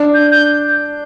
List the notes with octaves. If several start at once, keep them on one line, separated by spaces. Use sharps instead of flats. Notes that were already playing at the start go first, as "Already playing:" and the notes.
Already playing: D4
G6
G6